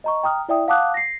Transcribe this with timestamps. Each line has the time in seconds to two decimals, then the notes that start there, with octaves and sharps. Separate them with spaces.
0.04 D#5 A#5 C#6
0.23 G5 A#5 D#6 F6
0.49 E4 D5 E5 G5 D#6
0.68 F5 F#5 A5 D6 D#6 F#6
0.94 A#6 C7